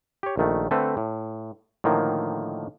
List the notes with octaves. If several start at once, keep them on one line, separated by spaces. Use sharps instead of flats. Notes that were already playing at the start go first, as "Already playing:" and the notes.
G4 C#5
A#1 D#3 A3
D3 A3 C4 A4 B4
A2
A2 D3 D#3 F3 A#3